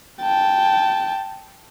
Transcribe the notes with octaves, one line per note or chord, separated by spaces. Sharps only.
G5 A5